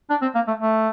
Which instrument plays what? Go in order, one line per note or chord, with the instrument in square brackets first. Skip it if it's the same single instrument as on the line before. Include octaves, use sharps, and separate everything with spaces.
[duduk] D4
C4
A#3
A3
A3